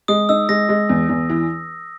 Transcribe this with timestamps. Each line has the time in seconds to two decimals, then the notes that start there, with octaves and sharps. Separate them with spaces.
0.08 G#3 D#6
0.29 D#4 E6
0.49 G#3 A#6
0.69 G#3
0.89 E2
1.09 E2
1.30 E3